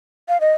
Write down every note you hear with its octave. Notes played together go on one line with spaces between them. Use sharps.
F5
D#5